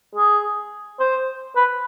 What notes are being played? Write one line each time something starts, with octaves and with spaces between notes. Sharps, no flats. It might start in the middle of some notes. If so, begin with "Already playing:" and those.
G#4
C5
B4